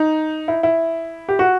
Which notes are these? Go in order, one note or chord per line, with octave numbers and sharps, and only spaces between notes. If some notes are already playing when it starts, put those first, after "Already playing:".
Already playing: D#4
E4
E4
G4
F#4